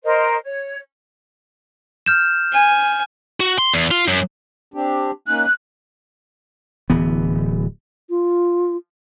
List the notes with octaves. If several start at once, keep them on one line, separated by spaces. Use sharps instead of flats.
A#4 C5 D#5
C#5
F6 G6 E7
G#5
F#4
C6
E2
F4
F#2
C4 D4 G4
A#3 C#4 D#4 F#6
D1 E3 B3
F4